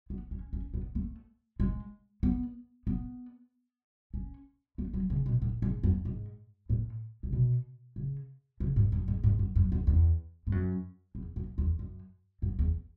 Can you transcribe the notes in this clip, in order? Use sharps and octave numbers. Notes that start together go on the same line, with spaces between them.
B3
C#4
C#4
B3
A3
G#3
B3
B3
C#4
A3
F#3
C#3
B2
A2
G#2
F#2
G#2
A2
C#3
B2
C#3
C#3
G#2
F#2
G#2
G#2
F#2
F#2
E2
E2
G#2
F#2
E2
F#2
E2
F#2
F#2
E2